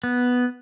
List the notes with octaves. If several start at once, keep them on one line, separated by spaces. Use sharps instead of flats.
B3